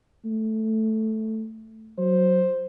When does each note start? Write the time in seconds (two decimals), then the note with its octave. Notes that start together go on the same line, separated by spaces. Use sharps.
0.25 A3
1.98 F#3 C5